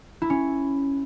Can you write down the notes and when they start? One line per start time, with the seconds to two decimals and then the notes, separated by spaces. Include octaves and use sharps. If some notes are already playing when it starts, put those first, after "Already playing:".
0.22 E4
0.30 C#4